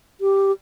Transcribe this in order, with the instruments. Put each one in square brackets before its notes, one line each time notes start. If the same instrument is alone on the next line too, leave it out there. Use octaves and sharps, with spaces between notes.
[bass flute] G4